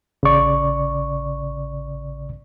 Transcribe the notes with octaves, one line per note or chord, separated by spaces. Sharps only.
A1 C#3 D5 C#6